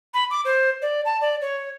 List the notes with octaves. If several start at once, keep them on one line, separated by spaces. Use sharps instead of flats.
B5
D6
C5
D5
A5
D5
C#5